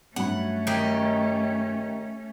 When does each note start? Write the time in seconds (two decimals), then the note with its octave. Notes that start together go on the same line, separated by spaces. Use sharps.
0.16 G2 F#3 A3 C#4 F#5 B5
0.67 D#3 G4 D#5